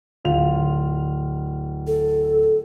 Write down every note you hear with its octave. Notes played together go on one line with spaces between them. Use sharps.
D1 F4 F7
A4